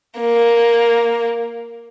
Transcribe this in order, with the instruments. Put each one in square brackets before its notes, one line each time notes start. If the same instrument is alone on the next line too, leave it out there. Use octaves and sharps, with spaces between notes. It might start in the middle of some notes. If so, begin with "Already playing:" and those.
[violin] A#3